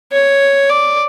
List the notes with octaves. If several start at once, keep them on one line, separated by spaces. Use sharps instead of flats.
C#5
D5